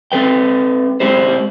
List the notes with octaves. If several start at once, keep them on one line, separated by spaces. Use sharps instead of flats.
C4 A4 B4 G5
G#3 C4 E4 G4 C5